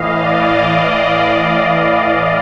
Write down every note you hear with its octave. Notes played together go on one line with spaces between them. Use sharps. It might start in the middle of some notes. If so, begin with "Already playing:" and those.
Already playing: A2 E3 D#5 F5
D5